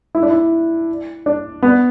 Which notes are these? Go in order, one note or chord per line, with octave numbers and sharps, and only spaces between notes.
E4
D4
E4
D4
B3